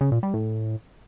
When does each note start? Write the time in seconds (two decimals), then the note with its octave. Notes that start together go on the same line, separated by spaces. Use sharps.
0.01 C#3
0.12 A#2
0.23 G3
0.34 A2